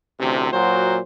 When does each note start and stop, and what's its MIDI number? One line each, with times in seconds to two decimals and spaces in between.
0.20 0.51 33
0.20 0.51 38
0.20 0.51 48
0.52 0.99 46
0.52 0.99 54
0.52 0.99 66
0.52 0.99 72